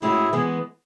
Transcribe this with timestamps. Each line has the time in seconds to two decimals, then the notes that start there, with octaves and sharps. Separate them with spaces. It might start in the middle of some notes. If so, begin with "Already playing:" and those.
0.02 A2 G#3 C#4 E4 F#4
0.33 E3 G#3 B3 G#4